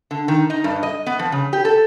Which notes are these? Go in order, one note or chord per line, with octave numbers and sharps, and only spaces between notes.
D3
D#3
D#4
G2
D#5
B3
F3
C#3
G4
A4